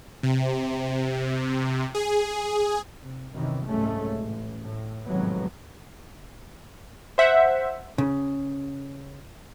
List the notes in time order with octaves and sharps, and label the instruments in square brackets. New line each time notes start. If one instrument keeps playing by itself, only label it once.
[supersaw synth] C3
G#4
[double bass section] C3
F#2 C3 D#3 E3
F#1 C2 G#2 G#3 A3 C#4
A1
A2
G#1 F2 A2 C3 F#3 B3
[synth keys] C5 E5 F#5
[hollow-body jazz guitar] C#3